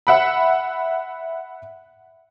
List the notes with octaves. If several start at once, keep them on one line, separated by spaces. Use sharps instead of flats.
E5 F#5 B5